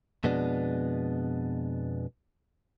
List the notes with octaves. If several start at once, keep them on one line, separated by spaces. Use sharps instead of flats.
F2 B2 G#3 B3 D4